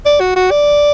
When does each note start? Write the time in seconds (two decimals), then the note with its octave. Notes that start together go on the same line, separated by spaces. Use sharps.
0.06 D5
0.20 F#4
0.36 F#4
0.51 D5